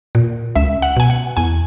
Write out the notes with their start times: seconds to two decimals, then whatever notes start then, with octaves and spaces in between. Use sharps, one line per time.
0.15 A#2
0.56 C#2 E5
0.82 F#5
0.97 B2 G#5
1.10 F#5
1.37 E2 G#5